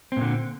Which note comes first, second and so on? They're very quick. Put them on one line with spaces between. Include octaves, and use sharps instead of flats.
C4 A#2 D3